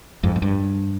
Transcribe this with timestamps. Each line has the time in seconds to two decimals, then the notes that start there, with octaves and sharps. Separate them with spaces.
0.23 F2 G#2
0.36 G#2
0.42 G2